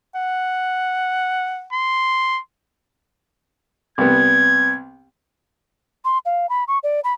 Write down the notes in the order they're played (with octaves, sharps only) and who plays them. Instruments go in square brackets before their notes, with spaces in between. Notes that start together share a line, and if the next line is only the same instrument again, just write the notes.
[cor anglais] F#5
[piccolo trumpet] C6
[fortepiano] C2 B3 [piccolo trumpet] G#6
[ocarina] C6
F5
B5
C#6
D5
B5